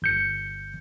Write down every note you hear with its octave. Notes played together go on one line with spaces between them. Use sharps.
G1 G6 C#7